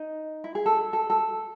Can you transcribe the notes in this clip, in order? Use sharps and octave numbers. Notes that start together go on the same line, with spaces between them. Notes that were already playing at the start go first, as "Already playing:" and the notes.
Already playing: D#4
E4
G#4
A4
A4
A4